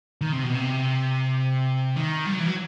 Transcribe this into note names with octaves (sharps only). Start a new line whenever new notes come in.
D#3
C3
B2
C3
D#3
G3
F#3
E3
F#3